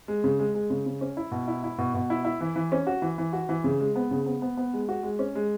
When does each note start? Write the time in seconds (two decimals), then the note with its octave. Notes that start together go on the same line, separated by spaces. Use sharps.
0.08 G#3
0.24 C#3
0.39 G#3
0.55 G#3
0.70 C#3
0.86 C#3
1.01 C#4
1.17 E4
1.32 B2
1.48 E4
1.63 E4
1.78 B2
1.94 B2
2.10 E4
2.25 E4
2.41 E3
2.56 E3
2.72 C#4
2.87 F#4
3.02 E3
3.18 E3
3.33 F#4
3.49 E3
3.64 C#3
3.80 G#3
3.96 B3
4.11 C#3
4.26 B3
4.42 B3
4.57 B3
4.73 G#3
4.89 F#4
5.03 G#3
5.19 C#4
5.35 G#3